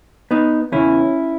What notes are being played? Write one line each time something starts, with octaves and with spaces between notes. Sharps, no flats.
B3 D#4
E2 C#3 E3 C#4 E4